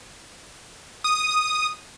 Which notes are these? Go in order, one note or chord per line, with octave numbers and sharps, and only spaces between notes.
D#6